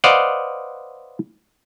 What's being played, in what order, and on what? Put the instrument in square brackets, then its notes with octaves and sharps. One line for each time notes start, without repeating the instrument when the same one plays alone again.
[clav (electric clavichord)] B4 C5 D5 D#5 F5 F#5